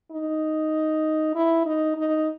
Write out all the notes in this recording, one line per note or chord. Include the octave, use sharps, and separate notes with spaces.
D#4
E4
D#4
D#4